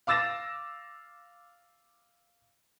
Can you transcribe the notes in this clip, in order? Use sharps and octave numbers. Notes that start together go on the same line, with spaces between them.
F5 D6 E6 A6 A#6 E7